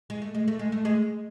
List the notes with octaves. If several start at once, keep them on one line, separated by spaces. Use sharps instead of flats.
G#3
A3
G#3
A3
G#3
A3
G#3